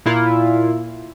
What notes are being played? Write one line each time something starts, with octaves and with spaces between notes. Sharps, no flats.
A#2 E4 F4